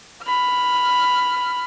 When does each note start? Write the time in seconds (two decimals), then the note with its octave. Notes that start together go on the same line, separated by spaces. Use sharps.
0.23 B5 F6